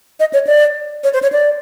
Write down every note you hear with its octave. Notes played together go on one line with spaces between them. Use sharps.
D#5
C#5
D5
C#5
C5
C#5
D5